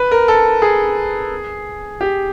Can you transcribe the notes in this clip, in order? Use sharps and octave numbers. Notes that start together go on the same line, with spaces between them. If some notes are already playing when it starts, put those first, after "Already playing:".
Already playing: B4
A#4
A4
G#4
G4